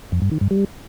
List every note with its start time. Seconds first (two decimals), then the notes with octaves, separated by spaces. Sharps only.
0.12 F2
0.22 G2
0.31 D#3
0.41 G2
0.51 G3